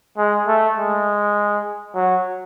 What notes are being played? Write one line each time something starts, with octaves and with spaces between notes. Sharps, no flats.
G#3
A3
G#3
F#3